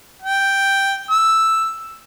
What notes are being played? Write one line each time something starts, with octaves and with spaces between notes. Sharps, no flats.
G5
E6